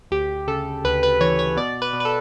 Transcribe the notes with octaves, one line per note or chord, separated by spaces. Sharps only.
D2 G4
C#3 A4
D2 B4
B4
E3 C#5
C#5
B2 D5
B4
B2
B4
A4